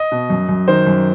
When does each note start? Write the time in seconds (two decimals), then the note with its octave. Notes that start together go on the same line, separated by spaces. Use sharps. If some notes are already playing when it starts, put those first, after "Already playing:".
Already playing: D#5
0.12 B2
0.30 F#2
0.49 F#2
0.68 D#3 C5
0.87 F#2